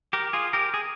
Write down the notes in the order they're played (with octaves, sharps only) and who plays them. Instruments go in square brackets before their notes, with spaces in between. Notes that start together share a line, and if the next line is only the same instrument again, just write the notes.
[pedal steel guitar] G4 A#4
F4 G#4
G4 A#4
G#4